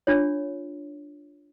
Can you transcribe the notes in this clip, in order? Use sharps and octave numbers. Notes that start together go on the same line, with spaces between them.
D4 F4 C#5